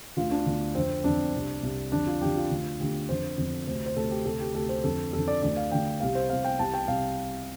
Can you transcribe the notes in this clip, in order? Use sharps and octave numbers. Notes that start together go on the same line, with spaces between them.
D2 D3 F4
D4
D2 D3
F2 D3 C4
F2 D3 D4
C2 C3
C2 C3
F2 D3 D4
F4
F2 D3 G4
F4
D2 D3
D2 D3 G4
F2 D3 C5
F2 D3
D2 C3 C5
C5
D2 C3 A4
G4
D2 C3 A4
G4
D2 C3 A4
C5
F2 D3 A4
F2 D3 A4
D5
D2 D3 D5
F5
D2 D3 G5
C2 C3 F5
C5
C2 C3 F5
G5
C2 C3 A5
G5
C2 C3 F5